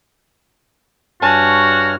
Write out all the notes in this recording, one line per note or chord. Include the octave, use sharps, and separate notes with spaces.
G2 F#4 C#5 G#5 A5 F6